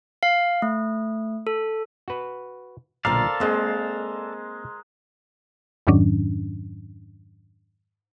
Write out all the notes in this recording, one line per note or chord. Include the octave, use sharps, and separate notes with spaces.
F5
A3
A4
F#4 B4
B1 A#2 D3 A4 A#4 C5 D5 F5
G#3 A#3 C4 C5 D#5
F2 G#2 D#3 F#3 C#4 D4